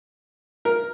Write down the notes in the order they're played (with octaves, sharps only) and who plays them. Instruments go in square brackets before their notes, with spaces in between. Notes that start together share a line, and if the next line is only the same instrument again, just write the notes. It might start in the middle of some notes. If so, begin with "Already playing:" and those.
[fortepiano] A#4